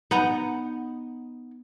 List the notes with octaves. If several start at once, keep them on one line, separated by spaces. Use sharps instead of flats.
B3 D#4 F#5 A#5